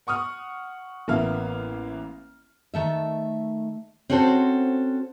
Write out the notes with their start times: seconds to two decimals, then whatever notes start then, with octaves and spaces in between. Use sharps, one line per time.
0.07 F#5 C#6 D#6 F6
1.08 A1 A#3 B3 E5 F5 F6
2.74 D#3 A3 E5
4.10 C4 C#4 F#4 A4 C5